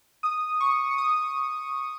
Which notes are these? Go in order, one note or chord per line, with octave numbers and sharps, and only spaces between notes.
D#6
C#6
C#6
D#6